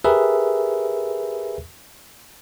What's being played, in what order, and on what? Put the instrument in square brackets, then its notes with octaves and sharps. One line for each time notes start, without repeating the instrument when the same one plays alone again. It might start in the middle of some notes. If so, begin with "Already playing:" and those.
[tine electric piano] G4 G#4 A#4 B4 E5